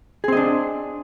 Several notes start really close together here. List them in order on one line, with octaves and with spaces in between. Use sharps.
G#4 C4 D#5 D4